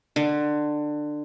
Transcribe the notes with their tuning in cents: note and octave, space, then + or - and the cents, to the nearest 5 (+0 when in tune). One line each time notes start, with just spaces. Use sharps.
D3 +20